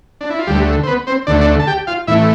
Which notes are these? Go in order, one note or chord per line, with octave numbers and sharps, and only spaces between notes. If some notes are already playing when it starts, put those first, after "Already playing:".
D4
E4
F4
D2 D3 G3 A3 G4
C5
B3 B4
C4 C5
D2 D3 A3 D4 D5
D4 D5
A5
G4 G5
F4 F5
A2 E3 A3 E4 E5